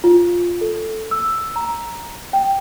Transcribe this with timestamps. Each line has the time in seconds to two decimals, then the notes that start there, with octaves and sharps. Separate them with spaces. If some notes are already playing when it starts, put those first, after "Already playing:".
0.04 F4
0.61 A4
1.11 E6
1.56 A#5
2.33 G5